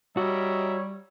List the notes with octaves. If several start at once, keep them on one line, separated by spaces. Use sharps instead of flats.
G3 F#4 C#5 D#5 E5 A#5